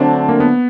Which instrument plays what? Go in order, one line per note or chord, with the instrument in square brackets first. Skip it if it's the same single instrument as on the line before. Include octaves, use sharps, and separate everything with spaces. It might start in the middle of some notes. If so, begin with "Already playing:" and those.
Already playing: [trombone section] D3 F#3 A3 D4 [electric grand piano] C4
[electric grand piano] A#3
B3